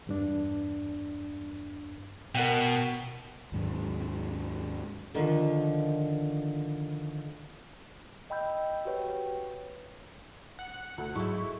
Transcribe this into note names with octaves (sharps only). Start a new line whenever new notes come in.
E2 G2 D4
B2 A#4 F#5 G5
D#2 G#2 F#3
D3 D#3 F3
D#5 G5 B5 E6 G6
F#4 G4 B4 C#5 G5
F#5
D2
G#2 F#3 G#3 A3 E4 C#6